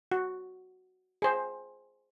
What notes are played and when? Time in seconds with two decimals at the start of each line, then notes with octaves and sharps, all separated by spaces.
0.12 F#4
1.22 G#4 C5